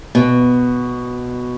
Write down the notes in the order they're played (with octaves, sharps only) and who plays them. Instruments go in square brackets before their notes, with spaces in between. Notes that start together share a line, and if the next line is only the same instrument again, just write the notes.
[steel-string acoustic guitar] B2